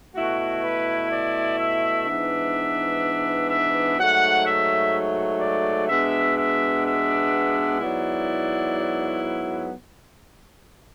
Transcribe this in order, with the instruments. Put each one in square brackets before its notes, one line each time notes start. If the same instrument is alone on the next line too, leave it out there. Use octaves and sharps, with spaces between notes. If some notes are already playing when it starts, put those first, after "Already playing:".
[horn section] B2 A3 E4 F#4
B4
D5
E5
G#2 E3 B3 D4
E5
G#2 F#3 A3 F#5
E5
D5
B2 G#3 B3 D4 E5
E5
E5
G#2 F#3 B3 E4 D5